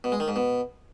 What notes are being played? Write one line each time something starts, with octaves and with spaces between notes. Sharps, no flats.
B2
G#3
D#3
G#2
B2